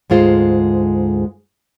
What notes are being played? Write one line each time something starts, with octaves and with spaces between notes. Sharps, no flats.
D2 G#2 G#3 F4 C5